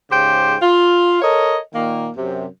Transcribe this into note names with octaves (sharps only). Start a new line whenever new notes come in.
G#2 C#3 G4 C5 G5
F4
A4 A#4 C#5 D#5
A#2 D#3 A#3
F#2 C3